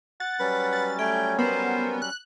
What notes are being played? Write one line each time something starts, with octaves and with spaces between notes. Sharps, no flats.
F#5 A6
F#3 G3 C#4 B4
A6
A3 G5 G#5
B3 A#4 C5
F#6